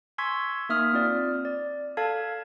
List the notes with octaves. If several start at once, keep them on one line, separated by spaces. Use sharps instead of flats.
G#5 C6 C#6 E6 G#6 B6
A#3 D#4 E5 D#6 F6
C4 F4 D5
D5
A4 F5 A5 G#6